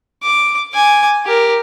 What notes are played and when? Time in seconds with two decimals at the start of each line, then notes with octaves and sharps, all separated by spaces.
0.23 D6
0.74 G#5 D6
1.25 G4 A#4